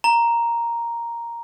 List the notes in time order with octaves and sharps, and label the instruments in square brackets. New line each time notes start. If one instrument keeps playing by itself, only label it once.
[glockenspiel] A#5